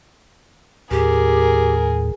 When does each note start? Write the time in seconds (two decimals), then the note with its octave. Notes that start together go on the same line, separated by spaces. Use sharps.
0.91 D#2 A2 G4 G#4 A#4